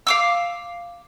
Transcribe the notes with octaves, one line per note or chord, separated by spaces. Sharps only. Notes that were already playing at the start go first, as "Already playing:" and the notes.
F5 D6 E6